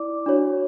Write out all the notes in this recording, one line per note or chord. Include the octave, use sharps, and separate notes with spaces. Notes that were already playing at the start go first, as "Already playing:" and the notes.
Already playing: E4 D5 D6
D4 F#4 C#5